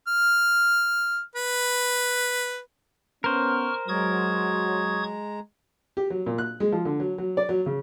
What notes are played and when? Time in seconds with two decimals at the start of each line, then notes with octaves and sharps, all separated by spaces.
0.07 F6
1.35 B4
3.24 B3 C#4 A#4 C5 C#6 F6
3.88 F#3 G#3 A#5 C#6 D#6 G#6
5.97 G4
6.10 F#3
6.26 A#2
6.38 F#6
6.60 G#3
6.72 F3
6.85 D3
7.00 F#3
7.18 F#3
7.37 D5
7.49 F#3
7.66 C#3